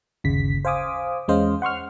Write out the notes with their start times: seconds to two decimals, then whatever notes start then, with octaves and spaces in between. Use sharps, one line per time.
0.24 G1 D#2 C#3 B6
0.65 C5 F5 G#5 D6 D#6
1.28 E2 G#3 C#4 C5 D#5 F5
1.62 F#5 C6 C#6 F6